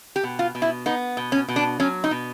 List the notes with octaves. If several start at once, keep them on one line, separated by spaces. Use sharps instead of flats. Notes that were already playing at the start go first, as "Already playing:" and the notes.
G4
B2
F4
B2
E4
B3 D#4
B2
C#4
B2
D4
F#3 C#4
D#4
B2